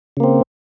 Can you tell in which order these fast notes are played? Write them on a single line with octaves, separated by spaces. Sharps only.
C#3 A#3 C4